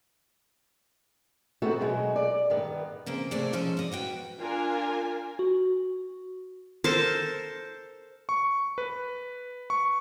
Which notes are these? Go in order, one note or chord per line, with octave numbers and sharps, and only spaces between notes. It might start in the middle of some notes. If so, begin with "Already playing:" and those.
B3 C4 D#4 F#4 A4 C5
B2 F#3 G#3
D5
G2 D#3 B3
C#3 A#3 C4
C3 A3 A#3 G#4 D5
B2 F3 G#3 C#4 D#4 A4
D5 D#5
B3 F#4 G5
D4 F4 A#4 G#5
F#4
A4 A#4 C5 A5
C#6
B4
C#6